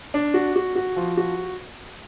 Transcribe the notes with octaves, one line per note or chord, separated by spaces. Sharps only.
D4
F#4
F#4
F#4
F3
F#4